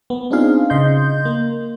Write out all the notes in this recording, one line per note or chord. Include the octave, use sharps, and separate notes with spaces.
B3
C4 D4 D#4 F4 G#4 F5
C#3 D#5 C6 G6
A#3